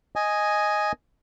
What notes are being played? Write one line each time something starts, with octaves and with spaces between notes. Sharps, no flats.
D#5 G#5